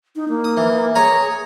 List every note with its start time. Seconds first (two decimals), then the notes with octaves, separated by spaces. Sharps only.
0.16 D#4
0.29 A#3
0.44 D#6
0.57 E3
0.95 G#4 C#5 G#5 A#5